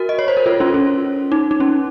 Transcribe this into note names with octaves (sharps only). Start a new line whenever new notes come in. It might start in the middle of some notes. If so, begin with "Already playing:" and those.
Already playing: F#4 A#4
D#5
C#5
C5
A#4
F4 A4
C#4 F4
C#4
D#4
D#4
C#4